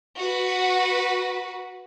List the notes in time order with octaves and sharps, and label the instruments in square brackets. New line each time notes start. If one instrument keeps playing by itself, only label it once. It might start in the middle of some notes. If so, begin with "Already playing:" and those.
[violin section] F#4 B4